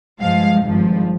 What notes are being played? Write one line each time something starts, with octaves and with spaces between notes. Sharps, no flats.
G2 F3 G#3 F5
G#1 G2 F3